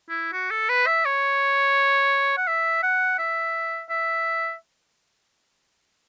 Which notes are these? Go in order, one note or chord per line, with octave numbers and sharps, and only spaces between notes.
E4
F#4
A4
B4
E5
C#5
F#5
E5
F#5
E5
E5